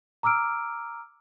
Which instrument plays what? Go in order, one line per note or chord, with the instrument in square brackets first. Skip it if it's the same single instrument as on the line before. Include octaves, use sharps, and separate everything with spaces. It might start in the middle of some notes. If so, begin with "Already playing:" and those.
[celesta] A#5 D6 E6 F6 D7